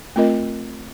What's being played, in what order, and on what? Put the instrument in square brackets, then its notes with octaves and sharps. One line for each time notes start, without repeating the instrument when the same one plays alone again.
[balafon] A3 C4 F4 A#4 D#5